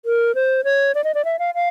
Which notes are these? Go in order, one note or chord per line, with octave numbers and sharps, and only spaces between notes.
A#4
C5
C#5
D5
D#5
D5
E5
F5
F5